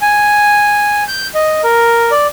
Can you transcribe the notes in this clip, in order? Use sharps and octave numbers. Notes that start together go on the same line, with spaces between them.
G#5
G6
D#5
A#4
D5